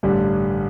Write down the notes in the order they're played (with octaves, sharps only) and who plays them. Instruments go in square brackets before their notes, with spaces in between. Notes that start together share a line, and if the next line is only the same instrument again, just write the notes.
[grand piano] A1 G2 D3 G3